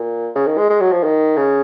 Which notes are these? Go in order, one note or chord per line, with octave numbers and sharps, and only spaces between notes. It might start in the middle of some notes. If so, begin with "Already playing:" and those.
Already playing: A#2
C#3
D#3
G#3
G#3
F#3
F3
D#3
C#3